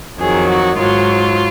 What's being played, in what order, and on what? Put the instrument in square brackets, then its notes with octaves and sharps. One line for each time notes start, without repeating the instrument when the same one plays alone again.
[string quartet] F2 D#3 F#3 G#4
F#4
G#2 F#3 F4